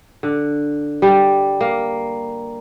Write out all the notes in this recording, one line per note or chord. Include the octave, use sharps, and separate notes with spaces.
D3
G3
A#3